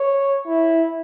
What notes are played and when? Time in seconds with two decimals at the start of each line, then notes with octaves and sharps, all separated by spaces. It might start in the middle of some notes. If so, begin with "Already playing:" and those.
Already playing: C#5
0.47 E4